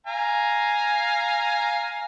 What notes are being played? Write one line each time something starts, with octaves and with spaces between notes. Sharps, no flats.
F5 G#5 A#5